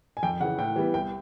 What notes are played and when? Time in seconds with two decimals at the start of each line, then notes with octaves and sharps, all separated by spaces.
0.17 G#5
0.23 F2 G5
0.40 C#3 F#5
0.44 E3
0.58 A2 G5
0.76 E3 G3 B3
0.94 C2 G5